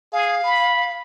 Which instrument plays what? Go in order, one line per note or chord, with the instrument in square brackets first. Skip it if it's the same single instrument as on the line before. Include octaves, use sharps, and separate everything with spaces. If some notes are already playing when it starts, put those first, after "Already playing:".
[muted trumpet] G#4 [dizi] F5
[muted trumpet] B5